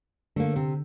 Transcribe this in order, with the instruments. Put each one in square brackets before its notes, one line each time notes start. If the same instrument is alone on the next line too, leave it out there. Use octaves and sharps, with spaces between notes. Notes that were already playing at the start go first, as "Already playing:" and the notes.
[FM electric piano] D3 [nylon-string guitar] A3 A#3
[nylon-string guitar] C3